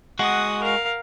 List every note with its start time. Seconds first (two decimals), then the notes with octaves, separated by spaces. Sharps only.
0.19 G#3 F#4 F#5 D#6
0.62 A#4 F5